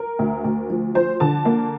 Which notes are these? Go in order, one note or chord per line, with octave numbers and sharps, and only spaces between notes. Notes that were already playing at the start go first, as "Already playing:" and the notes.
Already playing: A#4
D2
D2
F3
F3 C5
D3 A5
A#3